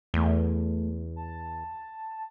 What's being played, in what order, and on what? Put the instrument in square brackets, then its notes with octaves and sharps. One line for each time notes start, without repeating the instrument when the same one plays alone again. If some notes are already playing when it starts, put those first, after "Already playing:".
[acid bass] E2 [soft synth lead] A3
[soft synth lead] A5